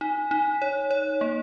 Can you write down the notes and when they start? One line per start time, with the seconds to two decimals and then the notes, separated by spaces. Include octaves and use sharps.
0.01 D#4
0.31 D#4
0.62 C#5
0.91 C#5
1.21 A#3